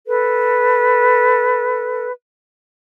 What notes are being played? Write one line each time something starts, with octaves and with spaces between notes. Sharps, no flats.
A4 B4